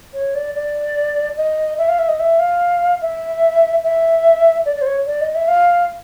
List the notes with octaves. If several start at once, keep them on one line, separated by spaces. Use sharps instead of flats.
C#5
D5
D5
D#5
E5
F5
E5
D#5
E5
F5
E5
E5
D5
D5
C5
C#5
D5
D#5
E5
F5